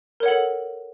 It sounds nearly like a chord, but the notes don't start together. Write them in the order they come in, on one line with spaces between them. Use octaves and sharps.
A#4 C#5 F#5 A4